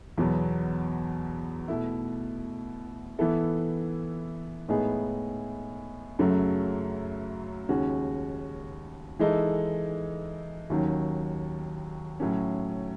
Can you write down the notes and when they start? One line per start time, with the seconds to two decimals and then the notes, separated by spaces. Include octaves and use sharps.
0.18 E2 B2 F#3 B3
1.68 B2 A3 E4
3.19 E3 B3 E4 A4
4.69 A2 G#3 B3 D#4 G#4
6.19 F#2 C#3 F#3 A3
7.69 D#2 C#3 G#3 C#4 F#4
9.19 E3 G#3 D#4 A4
10.70 D#2 D#3 F#3 C#4
12.20 A2 F#3 C#4